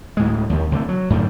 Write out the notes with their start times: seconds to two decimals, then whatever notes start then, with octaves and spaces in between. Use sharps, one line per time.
0.17 D2 A2 G#3
0.50 D#2 D#3
0.71 C2 D3 G#3 A3
0.89 F#3
1.10 F#2 A2 D3 D#3